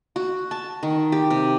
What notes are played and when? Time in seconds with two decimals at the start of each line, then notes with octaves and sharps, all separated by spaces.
0.16 F#4
0.51 A5
0.83 D#3
1.12 G4
1.30 C3